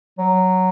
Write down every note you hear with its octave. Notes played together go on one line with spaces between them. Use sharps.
F#3